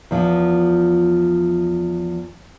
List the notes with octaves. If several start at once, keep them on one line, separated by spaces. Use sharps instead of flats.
E2 F3